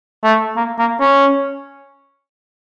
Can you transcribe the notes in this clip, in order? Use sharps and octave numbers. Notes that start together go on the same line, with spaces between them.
A3
A#3
A#3
C#4